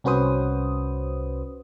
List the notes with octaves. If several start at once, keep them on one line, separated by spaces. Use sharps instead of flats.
C2 C#4 F#4 B4 C5 D#6